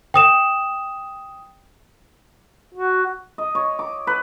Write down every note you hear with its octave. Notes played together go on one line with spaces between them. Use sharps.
G5 D#6 E7
F#4
D#5
C#5
D6
B4